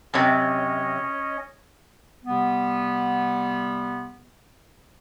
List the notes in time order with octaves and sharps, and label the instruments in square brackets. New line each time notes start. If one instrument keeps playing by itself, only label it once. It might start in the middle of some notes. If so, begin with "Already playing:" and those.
[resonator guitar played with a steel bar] F#2 C3 [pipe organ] C#4 C#5 D#5
[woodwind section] C3 G3 B3